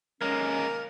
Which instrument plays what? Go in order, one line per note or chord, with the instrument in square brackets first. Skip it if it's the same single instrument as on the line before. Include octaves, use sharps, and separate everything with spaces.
[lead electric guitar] G#3 A#3 [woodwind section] C#4 [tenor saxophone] A#4